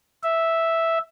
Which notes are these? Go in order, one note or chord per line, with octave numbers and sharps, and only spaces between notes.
E5